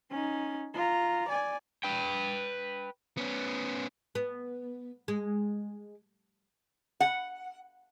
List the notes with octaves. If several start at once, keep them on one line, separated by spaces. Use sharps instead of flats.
C#4 D#4
F4 A#5
D5 G#5
B4 G5
B3 C#4
B3
G#3
F#5